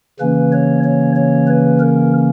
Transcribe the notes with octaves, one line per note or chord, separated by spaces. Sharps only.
C#3 E3 A#3 C#4 B4
C#5
C#5
C#5
B4
A#4